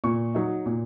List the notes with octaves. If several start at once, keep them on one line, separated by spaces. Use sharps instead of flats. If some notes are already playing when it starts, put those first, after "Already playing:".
A#2 C#6
F#3 D#4
A#2